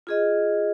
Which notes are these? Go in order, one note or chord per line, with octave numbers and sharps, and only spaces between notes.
F4 G#4 D#5